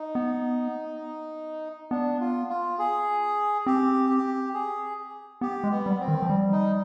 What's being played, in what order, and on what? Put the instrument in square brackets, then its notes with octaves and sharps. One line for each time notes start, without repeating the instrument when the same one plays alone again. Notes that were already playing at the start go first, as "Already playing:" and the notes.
Already playing: [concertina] D#4
[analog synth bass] B3
[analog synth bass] B3 [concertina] D4
[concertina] F4
F4
G#4
[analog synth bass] C4 [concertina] G4
[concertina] G4
G#4
[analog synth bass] B3 [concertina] G4
[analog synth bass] G#3
[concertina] B3
[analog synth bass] G3
[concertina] C4
[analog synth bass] D#3
F3
G3
[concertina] D#4